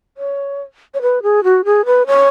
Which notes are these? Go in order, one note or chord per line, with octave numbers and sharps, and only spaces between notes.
C#5
C#5
B4
G#4
F#4
G#4
B4
C#5